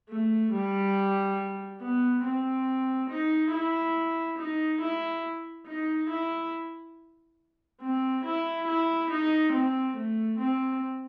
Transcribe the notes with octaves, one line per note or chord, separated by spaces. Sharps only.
A3
G3
B3
C4
D#4
E4
D#4
E4
D#4
E4
C4
E4
E4
D#4
C4
A3
C4